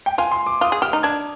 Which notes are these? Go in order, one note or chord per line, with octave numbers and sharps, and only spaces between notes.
G5
F4 G#5
C6
D6
F4 D#6
G#4
G4 F6
D#4
D4 G#6